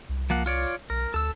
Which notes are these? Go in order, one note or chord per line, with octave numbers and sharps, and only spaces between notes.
C2
F3 A#3 F#5
F4 C#5 D5
B1 A#4
D2 A4 E6